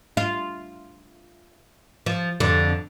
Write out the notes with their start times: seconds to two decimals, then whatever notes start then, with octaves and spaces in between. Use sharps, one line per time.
0.17 F4
2.06 F3
2.40 F2 D3